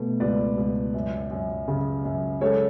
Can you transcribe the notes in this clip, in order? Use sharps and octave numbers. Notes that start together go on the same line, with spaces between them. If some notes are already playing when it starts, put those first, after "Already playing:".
Already playing: B2 A3
C#2 B4 D5
C#2
F#2
F#2
C#3
F#2
G#3 A4 C#5